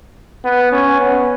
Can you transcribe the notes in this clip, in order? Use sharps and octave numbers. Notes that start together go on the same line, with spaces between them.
B3
C#4
B3